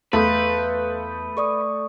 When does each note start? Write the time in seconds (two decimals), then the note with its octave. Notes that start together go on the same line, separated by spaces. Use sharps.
0.13 E2 A3 B4 F5 C6 D#6 G6
1.37 A4 D5 C#6 D#6